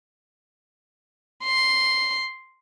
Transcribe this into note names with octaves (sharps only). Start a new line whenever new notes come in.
C6